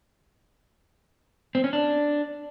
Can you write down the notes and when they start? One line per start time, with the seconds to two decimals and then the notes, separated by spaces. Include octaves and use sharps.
1.55 C4
1.64 C#4
1.73 D4